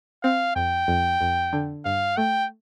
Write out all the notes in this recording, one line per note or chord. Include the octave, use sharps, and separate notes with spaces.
C4 F5
F2 G5
F2
F2
D3
G2 F5
A3 G5